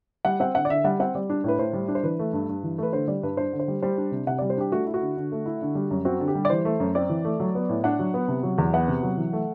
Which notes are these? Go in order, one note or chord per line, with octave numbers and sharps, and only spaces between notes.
G3 F#5
C4 F#5
D3 F#5
D5
D3 E5
G3 F#5
C4 F#5
G3 D5
D4
A2 B4
A2 C5
G3
D4
C5
E3 B4
A3
G2
G2
E3
A3 B4
D3 C5
G3 D5
G2 B4
D4 C5
D3
C5
G3
G3 C5
D4
C3
C3 F#5
G3 D5
C5
D4 G4
A3 F#4
E4
F#4
D3
D3
A3
E4
D3
G3
F#2
C4 F#4
D3
G4
G3
D5
E3 C5
A3
F#2
C4 D5
E3
A3
F#3
B3
A2
D4 F#5
F#3
B3
C3
F#3
E2
B3 F#5
C3
F#3
E3
A3